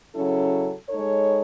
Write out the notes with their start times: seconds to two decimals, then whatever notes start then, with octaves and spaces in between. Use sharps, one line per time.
0.15 C#3 F#3 C#4 E4 A4
0.88 G#3 D#4 A4 C#5